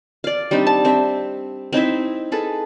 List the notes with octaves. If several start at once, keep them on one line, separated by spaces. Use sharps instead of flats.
D5 F5
G3 C4 D4 D#4
A5
C4 E5
C4 D#4 E4 E5
G#4 A4 B4